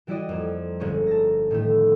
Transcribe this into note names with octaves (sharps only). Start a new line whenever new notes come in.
E3 G3 E4 F#4 D5 D#5
F2 A#3
G1 G#3 A#3 C#4 C#5 C#6
A5 A#6
A2 D#3 F3 A3